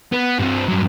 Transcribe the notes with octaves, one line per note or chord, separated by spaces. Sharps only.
B3
G2 C4
G2 F#3